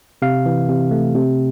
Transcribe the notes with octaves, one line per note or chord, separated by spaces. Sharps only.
C3 F5
E3
C3
A3
C3